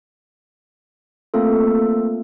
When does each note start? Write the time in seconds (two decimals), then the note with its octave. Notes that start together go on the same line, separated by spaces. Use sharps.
1.34 A3 A#3 C4 F4 A4